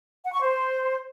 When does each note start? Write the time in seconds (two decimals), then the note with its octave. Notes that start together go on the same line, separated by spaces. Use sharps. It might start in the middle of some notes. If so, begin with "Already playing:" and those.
0.24 F#5
0.33 C#6
0.42 C5